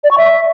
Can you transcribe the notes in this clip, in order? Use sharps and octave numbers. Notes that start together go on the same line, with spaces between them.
D5
C#6
E5